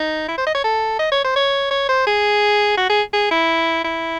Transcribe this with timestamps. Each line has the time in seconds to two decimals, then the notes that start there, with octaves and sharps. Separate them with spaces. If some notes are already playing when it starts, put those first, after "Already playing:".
Already playing: D#4
0.28 E4
0.38 C5
0.47 D#5
0.55 C#5
0.64 A4
0.99 D#5
1.12 C#5
1.24 C5
1.36 C#5
1.71 C#5
1.89 C5
2.07 G#4
2.77 F#4
2.89 G#4
3.13 G#4
3.31 E4
3.84 E4